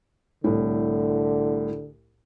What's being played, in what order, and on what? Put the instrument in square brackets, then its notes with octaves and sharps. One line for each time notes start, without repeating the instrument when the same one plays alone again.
[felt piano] C2 A2 [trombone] D3